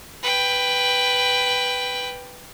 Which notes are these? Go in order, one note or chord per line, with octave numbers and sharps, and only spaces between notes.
B4 G5